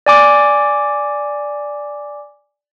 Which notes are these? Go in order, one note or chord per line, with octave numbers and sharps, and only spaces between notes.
D5 G#5 D6